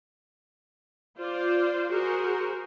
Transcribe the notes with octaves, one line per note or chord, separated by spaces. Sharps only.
F4 C5 D5
F#4 G#4 A#4 C5